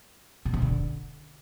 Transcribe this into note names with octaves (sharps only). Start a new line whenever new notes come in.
B2
C3
D3